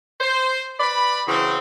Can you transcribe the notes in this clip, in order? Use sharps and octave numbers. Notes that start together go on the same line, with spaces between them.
C5
B4 D5 B5
C#3 E3 F#3 C4